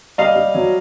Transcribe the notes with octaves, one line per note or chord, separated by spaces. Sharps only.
G3 D#5 F5
G3
F#3